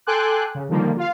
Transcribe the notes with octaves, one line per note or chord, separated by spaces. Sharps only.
A4 G5 G#5 C6 D6 F#6
C#3
D3 D#3 F3 G3 A#3
F4 F5